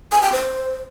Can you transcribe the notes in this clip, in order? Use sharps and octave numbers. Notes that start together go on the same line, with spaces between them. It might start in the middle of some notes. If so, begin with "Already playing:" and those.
G#5
G5
C5